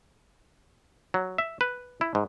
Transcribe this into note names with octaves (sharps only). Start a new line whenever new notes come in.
F#3
E5
B4
E4
G#2